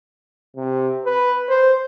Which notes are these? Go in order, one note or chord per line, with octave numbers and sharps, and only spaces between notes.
C3
B4
C5